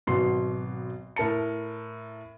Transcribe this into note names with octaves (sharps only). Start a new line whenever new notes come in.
G#1 B2 F#3 C6 C7
A2 A#4 A5 C#7